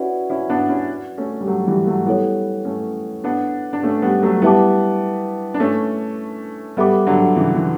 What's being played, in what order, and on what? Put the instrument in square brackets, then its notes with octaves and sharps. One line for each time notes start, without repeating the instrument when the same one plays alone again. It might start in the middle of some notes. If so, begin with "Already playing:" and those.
Already playing: [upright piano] C#4 E4 [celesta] F#4 B4 D5 F#5
[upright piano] C#4 E4
B3 D4
C#4 E4
A3 C#4
G3
F#3 A3
E3 G3
F#3 A3
[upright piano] G3 B3 [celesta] E4 A4 C#5
[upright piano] A3 C#4
B3 D4
D4
A3 C#4
G3 B3
F#3 A3
[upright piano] G3 B3 [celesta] E4 B4 E5 A5 D6
[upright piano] D4
A3 C#4
[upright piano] G3 B3 [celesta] A4 E5 B5 D6
[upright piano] D3 F#3
C#3 E3
E3